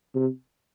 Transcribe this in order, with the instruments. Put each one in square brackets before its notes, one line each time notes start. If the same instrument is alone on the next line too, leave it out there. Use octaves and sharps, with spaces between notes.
[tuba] C3